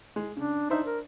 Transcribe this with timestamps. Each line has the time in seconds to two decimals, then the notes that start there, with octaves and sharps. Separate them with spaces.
0.16 G#3
0.37 C#3 D4
0.70 D4 D#4 C5 E5
0.86 A#4